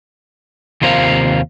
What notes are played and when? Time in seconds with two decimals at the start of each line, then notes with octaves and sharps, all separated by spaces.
0.82 D#2 C3 F4 A#4 C5 F5